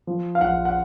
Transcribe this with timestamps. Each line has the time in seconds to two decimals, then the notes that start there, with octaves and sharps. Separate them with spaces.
0.07 F3
0.35 F5
0.41 A#1 F#5
0.65 F#5